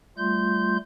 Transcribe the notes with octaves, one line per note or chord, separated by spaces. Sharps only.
G3 A3 F4 C6 G6